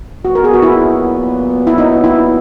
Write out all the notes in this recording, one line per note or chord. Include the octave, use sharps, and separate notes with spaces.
A#2 F#3 B3 F#4
A#4
G#4
F#4
E4
E4
D#4
E4